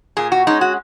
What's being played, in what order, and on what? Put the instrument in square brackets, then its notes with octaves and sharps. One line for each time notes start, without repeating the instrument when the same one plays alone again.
[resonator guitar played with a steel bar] A#2 G#4
F#4
G#3 C#4 D#4
F#4